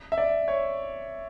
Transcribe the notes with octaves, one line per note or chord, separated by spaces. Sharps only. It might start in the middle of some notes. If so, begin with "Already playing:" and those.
E5
D5
C#5